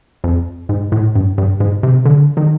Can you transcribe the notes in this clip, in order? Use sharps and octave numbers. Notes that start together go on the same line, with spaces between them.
F2
G#2
A2
G2
G2
G#2
C3
D3
D#3